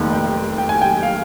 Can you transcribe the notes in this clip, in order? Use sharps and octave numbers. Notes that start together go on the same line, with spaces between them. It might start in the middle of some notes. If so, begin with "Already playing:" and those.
Already playing: F1 D#2 D#3
G5
G5
G#5
G5
F5